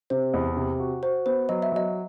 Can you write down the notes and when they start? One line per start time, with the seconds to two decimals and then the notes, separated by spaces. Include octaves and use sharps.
0.10 C3 C5
0.34 E2
0.57 C3
0.80 F#4
1.03 F#4 C5
1.26 B3 C5
1.49 F#3 D#5
1.62 E5
1.72 F#3 D#5